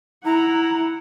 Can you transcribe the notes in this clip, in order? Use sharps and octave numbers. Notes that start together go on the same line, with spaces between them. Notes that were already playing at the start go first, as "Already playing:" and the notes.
E4 F#5 A#5